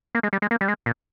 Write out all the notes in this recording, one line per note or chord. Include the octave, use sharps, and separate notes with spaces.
A#3
G#3
G3
G#3
A#3
G3
G#3
A#2